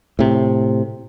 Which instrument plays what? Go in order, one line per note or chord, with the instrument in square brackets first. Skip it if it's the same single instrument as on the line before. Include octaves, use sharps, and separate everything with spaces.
[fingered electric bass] A2 C3